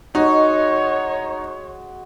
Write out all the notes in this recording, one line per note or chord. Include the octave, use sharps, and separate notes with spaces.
G#3 D#4 F#4 C#5